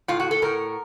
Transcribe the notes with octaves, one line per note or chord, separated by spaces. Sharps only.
A2 F4
F#4
A4
A2 A#4